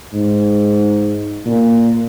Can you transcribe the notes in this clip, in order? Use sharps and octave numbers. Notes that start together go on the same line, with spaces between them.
G#2
A#2